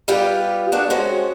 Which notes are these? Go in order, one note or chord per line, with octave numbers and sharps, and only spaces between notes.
G3 B3 F4 G4 G5
G#3 D4 F#4
G#3 C4 C#4 F#4